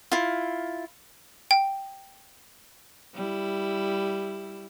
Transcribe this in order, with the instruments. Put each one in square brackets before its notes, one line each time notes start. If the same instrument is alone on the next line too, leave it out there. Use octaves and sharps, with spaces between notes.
[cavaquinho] E4 F4
[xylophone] G5
[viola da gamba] G3 E4